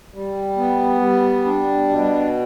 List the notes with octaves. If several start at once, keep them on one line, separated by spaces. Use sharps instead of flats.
G3
B3
G3
D4
B2